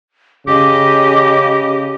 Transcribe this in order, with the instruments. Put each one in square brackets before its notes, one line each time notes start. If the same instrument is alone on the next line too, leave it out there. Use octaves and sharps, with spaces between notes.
[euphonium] C#3 [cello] G4 D#5 [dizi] D6